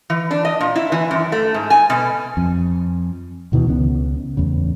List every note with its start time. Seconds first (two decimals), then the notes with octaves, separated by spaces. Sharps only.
0.10 E3
0.31 D4
0.45 D#5
0.61 A#2
0.76 E4
0.92 E3
1.11 F#2
1.32 A3
1.54 G#2
1.70 G#5
1.90 B2
2.37 F2
3.52 D2 B2 D#3 E3
3.66 C#2 C#3 G3 B3
4.37 E2 A2 C#3